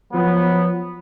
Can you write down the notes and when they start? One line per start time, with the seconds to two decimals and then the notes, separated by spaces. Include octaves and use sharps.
0.13 F3 F#3 B3